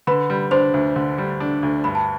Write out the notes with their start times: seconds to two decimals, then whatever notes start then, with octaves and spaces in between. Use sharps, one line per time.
0.07 D3 B4 B5
0.30 G3
0.51 D4 C5 C6
0.74 D2
0.96 D3
1.18 G3
1.40 D4
1.63 D2
1.84 G2 B5
1.95 A5